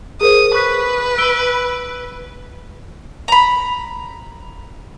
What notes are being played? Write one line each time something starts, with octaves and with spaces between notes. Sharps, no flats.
G#4 A#4 C5 D#6
B4 C#6 F#6 B6
E6 D7 G7
A#5 B5